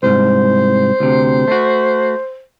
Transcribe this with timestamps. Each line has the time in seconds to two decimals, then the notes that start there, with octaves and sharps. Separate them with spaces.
0.03 C2 G#2 C5
1.00 D2 C3
1.48 A3 F#4